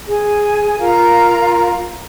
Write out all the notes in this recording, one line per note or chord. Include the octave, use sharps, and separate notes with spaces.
G#4
F4 A#4 F5 A#5